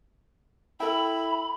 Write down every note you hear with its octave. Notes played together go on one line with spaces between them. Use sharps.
E4 A4 G5 B5